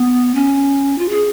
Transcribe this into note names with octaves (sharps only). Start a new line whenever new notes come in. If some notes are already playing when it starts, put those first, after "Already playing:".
Already playing: B3
C#4
F4
G#4